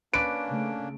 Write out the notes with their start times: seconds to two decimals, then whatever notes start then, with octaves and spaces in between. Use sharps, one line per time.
0.14 A#3 C#4 D4 B4 D5 D7
0.47 C#3 A3